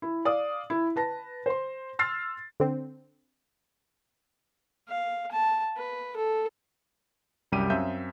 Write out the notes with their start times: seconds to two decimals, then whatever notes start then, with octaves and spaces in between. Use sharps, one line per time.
0.02 E4
0.25 D5 F5 D#6
0.70 E4
0.96 B4 A5 A#6
1.46 C5 C6
1.99 C6 E6 F6 A6 C7
2.60 D3 C4
4.89 F5
5.32 A5
5.77 B4
6.17 A4
7.52 C2 F#2 G3 G4 D#7
7.70 F#2 C4 E5 F5 G6